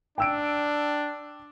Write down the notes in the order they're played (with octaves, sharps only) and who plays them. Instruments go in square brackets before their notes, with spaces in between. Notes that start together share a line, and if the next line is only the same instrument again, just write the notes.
[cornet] D4 [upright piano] G5 E6 D7